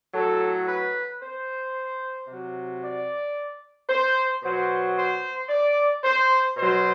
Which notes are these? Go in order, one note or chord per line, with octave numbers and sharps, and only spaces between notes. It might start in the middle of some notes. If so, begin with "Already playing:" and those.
A2 F#3 A4
B4
C5
C3
F#3
D5
C5
B2 F#3 C5
C5
D5
C5
B2 F#3 C5